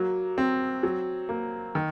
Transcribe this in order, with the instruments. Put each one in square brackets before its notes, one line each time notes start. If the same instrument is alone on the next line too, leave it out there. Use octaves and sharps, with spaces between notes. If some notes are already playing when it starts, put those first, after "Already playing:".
Already playing: [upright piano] F#3 A#3
C4
F#3
A#3
D#3